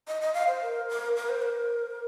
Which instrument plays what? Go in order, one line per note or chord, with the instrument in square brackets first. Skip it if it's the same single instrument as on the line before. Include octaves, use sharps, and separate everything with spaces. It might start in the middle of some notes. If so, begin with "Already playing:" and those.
[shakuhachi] D#5
D#5
F5
C5
A#4
A#4
A#4
C5
A#4